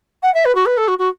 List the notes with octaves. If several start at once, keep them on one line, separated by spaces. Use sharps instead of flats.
F#5
E5
B4
F#4
B4
A4
F#4
F#4